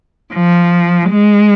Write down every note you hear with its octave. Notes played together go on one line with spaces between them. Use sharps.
F3
G#3